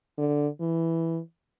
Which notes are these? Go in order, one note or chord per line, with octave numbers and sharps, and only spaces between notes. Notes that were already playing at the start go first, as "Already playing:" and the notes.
D3
E3